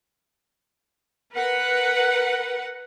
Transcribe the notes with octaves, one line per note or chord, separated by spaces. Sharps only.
A#4 B4 F#5